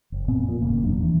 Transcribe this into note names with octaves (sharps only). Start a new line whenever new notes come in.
F#1
A#2 B3 C4
F2 A#2
F1 A2 C#3 A#3
E1 F#3 D4
E3